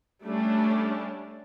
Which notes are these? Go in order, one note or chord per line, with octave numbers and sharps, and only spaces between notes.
G3 A3 C#4 D4